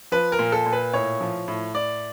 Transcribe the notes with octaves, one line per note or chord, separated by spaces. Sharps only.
F3 B4
A#4
A#2
A4
A#2
B4
A2 C#5
F3
A2
A2 D5